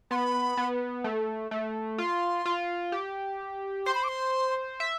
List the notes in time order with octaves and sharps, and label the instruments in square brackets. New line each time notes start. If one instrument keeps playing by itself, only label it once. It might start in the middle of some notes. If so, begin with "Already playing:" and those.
[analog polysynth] B3 [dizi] C6
[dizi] B5
[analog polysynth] B3
A3
A3
[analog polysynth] F4 [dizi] C6
[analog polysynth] F4
G4
[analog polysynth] C5 [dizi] C6
[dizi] B5
D6
C6
[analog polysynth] E5